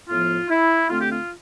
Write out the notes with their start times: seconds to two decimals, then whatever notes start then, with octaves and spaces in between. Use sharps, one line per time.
0.09 A2 F3 B3 F4
0.49 E4
0.89 D3 A3 C4 F4
1.00 G4
1.11 F4